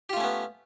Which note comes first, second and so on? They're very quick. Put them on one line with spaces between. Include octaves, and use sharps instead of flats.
G4 F4 A3 C#4 B3